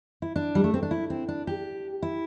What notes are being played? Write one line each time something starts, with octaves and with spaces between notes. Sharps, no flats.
E4
D4
G3
A3
C4
D4
E4
C4
D4
G4
E4